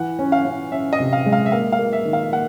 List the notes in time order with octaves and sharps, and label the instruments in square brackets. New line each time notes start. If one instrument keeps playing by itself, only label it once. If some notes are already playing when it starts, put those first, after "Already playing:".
Already playing: [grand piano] E3 [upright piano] F#5
[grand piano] C#4
[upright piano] F5
[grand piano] C#4
[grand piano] C#4 [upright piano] E5
[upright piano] D#5
[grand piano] C3
[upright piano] F5
[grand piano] G#3
[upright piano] F5
E5
[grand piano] A#3 [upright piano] F5
[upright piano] F5
[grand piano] A#3
[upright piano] E5
[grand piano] D#3
[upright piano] F5
[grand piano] A#3 [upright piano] F#5